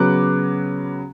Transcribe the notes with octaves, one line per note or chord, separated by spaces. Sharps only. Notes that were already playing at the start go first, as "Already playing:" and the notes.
Already playing: C#3 F#3 B3 D6 F#6